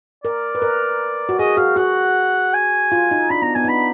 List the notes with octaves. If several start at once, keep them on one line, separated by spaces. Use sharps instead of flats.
A#4 D5
B4
A#4
F#4
G#4 D#5
F#4 F5
F#4 F#5
G#5
F4
D#4
D4 B5
B3 A#5
B3 G#5
D#4
D4 B5